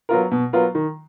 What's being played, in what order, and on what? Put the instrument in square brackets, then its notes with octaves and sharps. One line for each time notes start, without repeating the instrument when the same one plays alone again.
[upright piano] F#3 B3 F4 A#4
B2
F#3 B3 F4 A#4
D#3